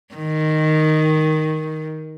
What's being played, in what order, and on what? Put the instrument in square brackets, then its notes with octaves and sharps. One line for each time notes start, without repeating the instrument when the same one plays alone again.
[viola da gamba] D#3